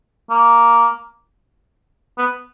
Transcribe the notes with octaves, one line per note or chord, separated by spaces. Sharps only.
A#3
B3